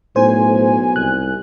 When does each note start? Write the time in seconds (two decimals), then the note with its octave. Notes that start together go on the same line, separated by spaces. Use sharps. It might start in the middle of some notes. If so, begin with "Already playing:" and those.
0.16 B1 A2 C5 G#5
0.96 C2 F#6